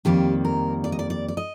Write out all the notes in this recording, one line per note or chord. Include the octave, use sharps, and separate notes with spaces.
F2 D#3 G3 A#3 G4
A#4
D5
D#5
D5
D5
D5
D#5